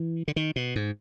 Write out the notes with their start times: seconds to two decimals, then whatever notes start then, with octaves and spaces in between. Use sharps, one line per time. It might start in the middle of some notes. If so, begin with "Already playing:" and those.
Already playing: E3
0.28 D3
0.36 D#3
0.56 B2
0.76 G#2